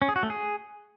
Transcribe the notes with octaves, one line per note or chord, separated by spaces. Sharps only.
C#4
G#4
F#4
A3
G#4